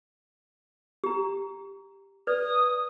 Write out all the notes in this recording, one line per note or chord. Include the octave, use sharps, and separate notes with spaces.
G4 A#5
B4 D5 D#6